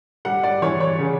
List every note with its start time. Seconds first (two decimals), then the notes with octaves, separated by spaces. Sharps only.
0.25 G3 F#5
0.43 D5
0.62 E3 C#5
0.81 C#5
0.99 C#3